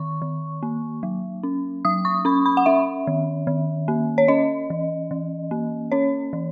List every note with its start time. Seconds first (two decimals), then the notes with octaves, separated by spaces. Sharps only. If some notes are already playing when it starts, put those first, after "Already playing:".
Already playing: D#3 C#6
0.22 D#3
0.63 A#3
1.03 F#3
1.43 C#4
1.85 F#3 D#6
2.05 C#6
2.25 C#4 B5
2.46 B5
2.57 F#5
2.66 C#4 E5
3.07 D#3
3.47 D#3
3.88 A#3
4.18 C#5
4.28 C#4 D#5
4.70 E3
5.11 E3
5.51 A#3
5.92 C#4 C#5
6.33 E3